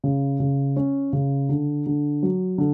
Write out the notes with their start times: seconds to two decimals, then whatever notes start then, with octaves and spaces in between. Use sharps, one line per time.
0.04 C#3
0.40 C#3
0.76 C#4
1.13 C#3
1.49 D3
1.86 D3
2.23 F#3
2.58 D3